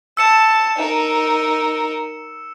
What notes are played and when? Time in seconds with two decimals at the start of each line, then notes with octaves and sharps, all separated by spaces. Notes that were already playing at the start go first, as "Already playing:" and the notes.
0.17 A5 E6 C#7 E7
0.76 D#4 A#4